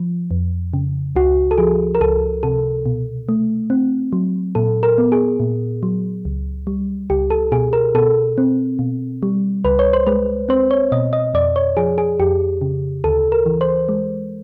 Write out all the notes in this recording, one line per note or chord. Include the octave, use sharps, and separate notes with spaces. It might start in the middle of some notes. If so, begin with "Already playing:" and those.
Already playing: F3
F2
C#3
C#2 F#4
A4
F3 G#4
A#4
C#2 A4
C3 A4
B2
A3
C4
F#3
A#2 A4
A#4
B3
G#4
A#2
F#3
C#2
G3
C#2 G4
A4
B2 G#4
A#4
B2 A4
C4
B2
G3
C#2 B4
C#5
C5
G#3 B4
C4 C5
C#5
B2 D#5
D#5
F2 D5
C#5
F3 G#4
G#4
F2 G4
C#3
D2 A4
A#4
E3
C5
G#3